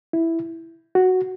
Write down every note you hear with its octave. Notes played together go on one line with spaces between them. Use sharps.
E4
F#4